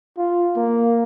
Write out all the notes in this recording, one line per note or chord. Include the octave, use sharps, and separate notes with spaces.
F4
A#3